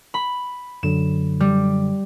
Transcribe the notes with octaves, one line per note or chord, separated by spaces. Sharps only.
B5
F#2 D3 F#3 E7
G3